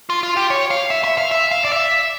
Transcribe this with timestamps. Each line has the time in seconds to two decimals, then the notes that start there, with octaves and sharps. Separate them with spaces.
0.10 F4
0.23 F4
0.37 G4
0.50 C#5
0.70 F5
0.90 E5
1.04 E5
1.18 F5
1.31 E5
1.51 F5
1.65 D5
1.72 E5